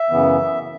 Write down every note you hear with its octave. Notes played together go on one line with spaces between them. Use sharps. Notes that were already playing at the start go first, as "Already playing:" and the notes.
Already playing: E5
F#2 C#3 E3 B3